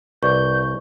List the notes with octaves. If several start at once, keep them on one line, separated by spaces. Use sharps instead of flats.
C2 B4 D5 C#6 G6